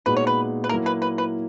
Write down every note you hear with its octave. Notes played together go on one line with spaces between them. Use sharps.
A#2 G#3 B3 D#4 F#4 B4
C#5
B4
B4
F#3 A#3 E4 A#4
B4
B4
B4